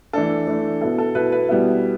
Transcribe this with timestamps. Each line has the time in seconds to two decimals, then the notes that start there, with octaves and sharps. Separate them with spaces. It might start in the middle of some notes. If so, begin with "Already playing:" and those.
0.13 E3 A3 D4 A4
0.47 E3 A3 D4
0.81 B2 B3 E4 A4
0.98 A4
1.15 B2 B3 E4 B4
1.32 B4
1.49 B2 G3 B3 E4